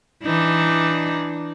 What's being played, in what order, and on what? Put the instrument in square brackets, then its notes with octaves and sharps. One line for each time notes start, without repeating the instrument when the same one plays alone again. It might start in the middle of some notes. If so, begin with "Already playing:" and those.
[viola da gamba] E3 D4 D#4